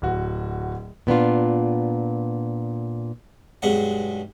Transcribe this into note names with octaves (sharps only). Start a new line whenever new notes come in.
D1 F#4
A#2 B3 D4 F4
B1 G2 G#3 F#5